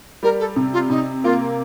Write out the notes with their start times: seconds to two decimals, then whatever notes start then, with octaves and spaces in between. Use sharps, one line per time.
0.23 G3 A#4
0.40 A4
0.56 C3
0.73 F4
0.90 C3 D#4
1.24 A#3 F4